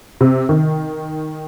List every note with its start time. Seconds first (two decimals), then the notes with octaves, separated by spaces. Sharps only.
0.21 C3
0.49 D#3